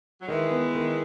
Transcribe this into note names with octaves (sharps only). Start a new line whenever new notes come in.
F#3
D#3 E3 G#3
B3
D#3